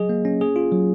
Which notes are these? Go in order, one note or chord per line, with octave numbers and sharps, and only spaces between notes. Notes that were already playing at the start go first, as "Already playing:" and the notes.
Already playing: F#3 G#4 D#5
A#3
C#4
G#4
F4
F#3